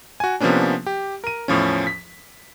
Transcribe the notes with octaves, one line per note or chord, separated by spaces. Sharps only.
F#4 G#5
C3 F3 A#3 B3 C#4 D4
G4
A#4 D#7
E2 A2 F3 C#4
B6